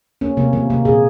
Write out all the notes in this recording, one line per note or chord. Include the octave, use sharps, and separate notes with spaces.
A#3 C#4
C3 A#3
D#3 A#3
C3 A#3
A#2 G#4